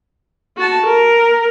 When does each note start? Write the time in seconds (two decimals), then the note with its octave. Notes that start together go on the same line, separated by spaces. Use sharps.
0.57 F#4 A5
0.86 A#4